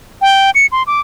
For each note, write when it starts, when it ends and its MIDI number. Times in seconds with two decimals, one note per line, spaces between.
0.22 0.50 79
0.55 0.66 97
0.72 0.83 84
0.87 1.01 86